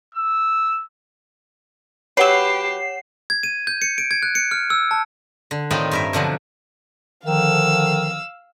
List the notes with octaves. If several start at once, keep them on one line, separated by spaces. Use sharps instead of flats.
E6
F#3 G4 B4 C#5 F#5 C7 E7
G#6
D#7
G6
C#7
D7
G#6
F#6
C#7
F6
E6
A5
D3
A2 D#3 C4 D#4 F4
G2 A#4 E5
B2 D3 F3 F#3
D3 D#3 F3 F5 E6